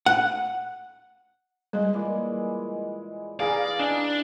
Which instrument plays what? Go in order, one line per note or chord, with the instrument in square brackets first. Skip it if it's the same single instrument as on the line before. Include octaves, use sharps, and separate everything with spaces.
[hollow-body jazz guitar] F#5
[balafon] G3 [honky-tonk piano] G#3
[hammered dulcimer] A#2 E3 D5
[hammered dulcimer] E3 A#5 [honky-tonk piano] G#4 F5 [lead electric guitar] D5
[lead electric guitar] D4 [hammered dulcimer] D#4 G#5